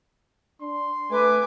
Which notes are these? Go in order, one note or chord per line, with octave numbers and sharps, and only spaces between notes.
D4 C6
A3 B4 G#5 D6